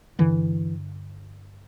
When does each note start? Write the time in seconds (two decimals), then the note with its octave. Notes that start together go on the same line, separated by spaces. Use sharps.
0.19 G2 D3 E3